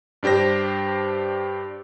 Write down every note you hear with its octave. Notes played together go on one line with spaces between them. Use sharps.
G2 D4 G4 C5 A#6